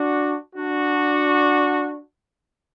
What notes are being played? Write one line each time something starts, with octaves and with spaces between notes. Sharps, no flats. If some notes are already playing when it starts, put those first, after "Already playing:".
Already playing: D4 F#4
D4 F#4